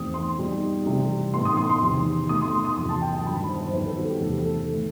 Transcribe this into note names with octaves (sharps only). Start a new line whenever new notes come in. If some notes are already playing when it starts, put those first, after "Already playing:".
Already playing: E2 B2 A3 C4 D#4 D#6
C6
B2 G3 D#4
C3 E3 G3
A2 E3 B3 D#4 C6
D#6
C6
C6
E2 C3 D#3
B2 A3 D#4 D#6
C6
C6
D#6
E2 C3 F#3 C6
A5
G5
A5
G2 D#3 F#3 B3 B5
B5
C5
C5
D#2 D#3 G3 B3 D#4 B4
A4
F#4
G4
E2 C3 D#3 A3 C4 A4
A4
D#3 A3